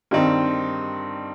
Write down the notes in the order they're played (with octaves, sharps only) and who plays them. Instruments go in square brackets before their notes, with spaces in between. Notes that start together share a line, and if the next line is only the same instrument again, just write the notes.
[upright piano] G2 D#3 G3 C4 D#4